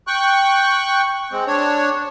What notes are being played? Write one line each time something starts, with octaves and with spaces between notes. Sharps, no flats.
G5 C#6 F#6
G#3 C4
D4 C#5